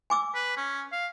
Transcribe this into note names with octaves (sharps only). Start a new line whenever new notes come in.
G#5 D6 E6
B4
C#4
F5